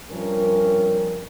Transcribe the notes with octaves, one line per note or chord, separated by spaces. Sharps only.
G2 F3 C4 C#4 A#4